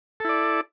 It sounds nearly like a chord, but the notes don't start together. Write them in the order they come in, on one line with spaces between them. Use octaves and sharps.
A4 E4 D5